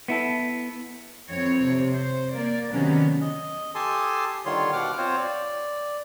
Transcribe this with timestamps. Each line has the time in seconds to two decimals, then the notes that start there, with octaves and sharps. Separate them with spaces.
0.08 B3 E4 A4
1.29 F2 E3 C4 C#5
1.64 C3
1.96 C5
2.33 A#3 D5
2.72 C3 D#3 F#3 B3 C#4 D4
3.21 D#5
3.75 G4 A4 G#5 A5 C6 D#6
4.46 D3 D#3 G3 F4 C#5 C6
4.73 B2 F#5 D6 F6
4.97 C4 F4 C5 C#5
5.17 D5